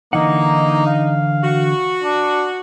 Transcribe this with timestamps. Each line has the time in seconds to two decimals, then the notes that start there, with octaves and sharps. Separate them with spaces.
0.13 D3 E3 A#3 D#4 F#5
0.87 F5
1.43 F#4
2.04 D4